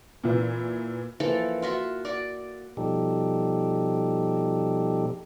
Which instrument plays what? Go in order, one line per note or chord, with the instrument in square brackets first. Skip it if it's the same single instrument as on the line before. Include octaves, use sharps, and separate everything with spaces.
[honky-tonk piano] A#2 E3
[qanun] E3 F3 A#3 A4
F4 F#4 E5
F#4 D5
[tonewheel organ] B2 F3 G3 D#4 G4 A4